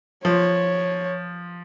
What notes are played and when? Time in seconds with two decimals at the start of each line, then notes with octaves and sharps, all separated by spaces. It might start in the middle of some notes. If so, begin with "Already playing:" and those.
0.25 F3 C#5